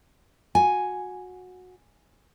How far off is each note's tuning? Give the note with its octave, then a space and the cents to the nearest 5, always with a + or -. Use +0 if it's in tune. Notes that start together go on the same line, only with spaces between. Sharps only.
F#4 -20 G#5 +0